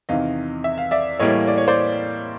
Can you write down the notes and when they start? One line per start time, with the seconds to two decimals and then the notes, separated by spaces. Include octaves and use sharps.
0.09 E2 C3 D#3 D#5 F5
0.64 E5
0.78 F5
0.91 D5 E5
1.19 A2 E3 G3 A#3 C#5 D#5
1.47 D5
1.58 C#5
1.68 C5 D5